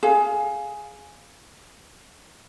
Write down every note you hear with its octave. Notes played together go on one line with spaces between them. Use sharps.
G#4 F5